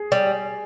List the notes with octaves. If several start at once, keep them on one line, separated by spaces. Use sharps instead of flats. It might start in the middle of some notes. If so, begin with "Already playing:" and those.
Already playing: G#4
G3